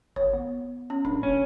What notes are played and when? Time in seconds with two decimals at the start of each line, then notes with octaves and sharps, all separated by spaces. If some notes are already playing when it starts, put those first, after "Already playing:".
0.16 G#1 C#5
0.33 B3
0.90 C#4
1.05 D1 D4
1.23 F1 C#4